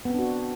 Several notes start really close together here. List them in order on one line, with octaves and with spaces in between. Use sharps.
B3 C4 D4 F#4